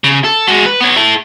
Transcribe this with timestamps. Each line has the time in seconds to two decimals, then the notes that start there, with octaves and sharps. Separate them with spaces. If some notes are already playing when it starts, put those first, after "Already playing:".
0.04 C#3
0.24 A4
0.47 G#3 F#4
0.66 B4
0.81 B3 C#5
0.96 E4 A4